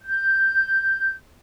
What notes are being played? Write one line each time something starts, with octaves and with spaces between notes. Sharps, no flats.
G6